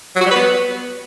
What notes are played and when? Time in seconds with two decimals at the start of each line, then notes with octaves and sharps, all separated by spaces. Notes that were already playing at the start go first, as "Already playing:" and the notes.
0.16 F#3
0.21 F#4
0.26 G3
0.31 B4
0.36 B3